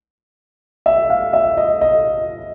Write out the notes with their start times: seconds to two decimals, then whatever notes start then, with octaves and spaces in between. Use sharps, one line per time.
0.86 E5
1.10 F5
1.33 E5
1.57 D#5
1.81 D#5